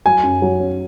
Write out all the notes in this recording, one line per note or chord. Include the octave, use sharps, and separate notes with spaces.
F#3 G#5
F#2
F#3
C#4